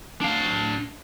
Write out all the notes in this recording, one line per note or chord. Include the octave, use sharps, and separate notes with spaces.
D4 F5